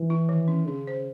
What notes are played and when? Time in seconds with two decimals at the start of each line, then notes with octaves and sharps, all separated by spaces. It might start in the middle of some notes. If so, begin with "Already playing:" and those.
Already playing: E3
0.10 E4
0.29 D#3
0.48 C#4
0.67 C#3 C#4
0.87 C5